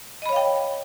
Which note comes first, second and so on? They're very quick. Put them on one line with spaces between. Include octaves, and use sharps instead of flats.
D#5 B5 C#5 F5 G5